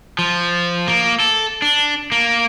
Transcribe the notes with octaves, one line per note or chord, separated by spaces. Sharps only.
F3
A#3
A4
D4
A#3